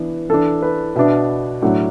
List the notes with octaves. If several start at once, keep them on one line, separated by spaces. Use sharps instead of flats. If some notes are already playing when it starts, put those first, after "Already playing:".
Already playing: E3 B3 D4
E3 D4 A4
B4
B2 B3 D4 E5
A2 F#3 A3 D4 F#5